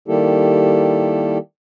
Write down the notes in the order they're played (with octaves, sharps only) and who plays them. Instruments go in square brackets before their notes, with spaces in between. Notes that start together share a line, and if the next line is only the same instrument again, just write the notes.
[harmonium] D#3 G3 A#3 E4 G4 A4